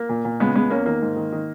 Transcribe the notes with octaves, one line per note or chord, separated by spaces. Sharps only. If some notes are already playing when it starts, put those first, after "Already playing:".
Already playing: A#3
A#2
A#2
C#3 G#3 B3
E2 G#3 B3
E2 A#3 C#4
D#3 A#3
G#2
D#3
D#3